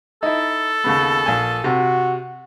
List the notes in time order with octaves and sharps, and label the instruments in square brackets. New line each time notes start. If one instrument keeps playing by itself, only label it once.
[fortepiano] D#4 E4 [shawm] A4
[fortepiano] D#2 C#3 B3
A#1 G#5
[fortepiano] C3 [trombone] F#4